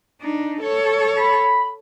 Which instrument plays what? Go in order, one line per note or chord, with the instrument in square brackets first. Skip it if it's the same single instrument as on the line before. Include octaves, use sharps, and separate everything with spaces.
[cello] D4 D#4
A4 C#5
[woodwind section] B5